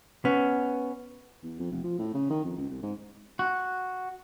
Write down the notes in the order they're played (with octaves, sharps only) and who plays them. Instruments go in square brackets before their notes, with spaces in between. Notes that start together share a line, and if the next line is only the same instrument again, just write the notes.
[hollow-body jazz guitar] B3 C#4
[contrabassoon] E2
F2
F1
F3
A2
C#3
D#3
F2
C#2
C2
G#2
[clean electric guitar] F#4